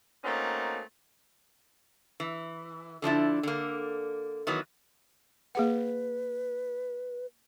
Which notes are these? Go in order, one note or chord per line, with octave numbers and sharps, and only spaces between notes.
A3 A#3 C4 C#4 D#4 F#4
E3
D3 F3 D4 E4
D3 A#3
D#3 E3 F#3 B3
A#3 G#4 B4 F#5